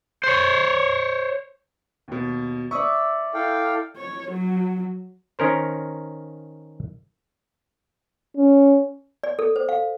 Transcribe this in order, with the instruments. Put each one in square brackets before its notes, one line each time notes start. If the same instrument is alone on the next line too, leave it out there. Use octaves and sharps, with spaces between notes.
[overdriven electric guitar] C5 C#5
[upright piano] D#2 B2
[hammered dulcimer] D5 E5 [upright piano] C#6 D#6
[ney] E4 [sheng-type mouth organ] A4 F5 G5
[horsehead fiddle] C#5
F#3
[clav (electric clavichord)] D#3 C#4 A#4 C5
[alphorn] C#4
[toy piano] D5
A4
C5
F5